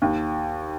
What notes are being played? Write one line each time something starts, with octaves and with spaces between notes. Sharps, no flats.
D#2